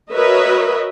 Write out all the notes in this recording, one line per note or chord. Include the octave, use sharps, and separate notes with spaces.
F#4 A#4 B4 C#5 D#5 E5